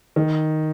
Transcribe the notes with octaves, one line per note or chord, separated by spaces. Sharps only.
D#3